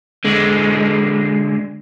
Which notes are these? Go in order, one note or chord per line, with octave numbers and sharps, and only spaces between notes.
D3 G#3